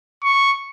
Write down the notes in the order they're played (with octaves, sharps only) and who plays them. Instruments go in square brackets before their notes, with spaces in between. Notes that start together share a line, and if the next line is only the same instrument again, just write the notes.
[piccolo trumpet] C#6